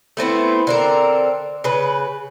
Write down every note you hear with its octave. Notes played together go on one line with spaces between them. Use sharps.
A3 B3 C4 E4
D3 C4 A#4
C#3 B4